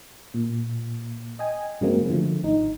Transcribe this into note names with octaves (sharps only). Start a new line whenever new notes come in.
A#2
D#5 G5 G#5
G2 C#3 F#3 G#3 A#3 C4
D3 F3 A3
G#1 D#4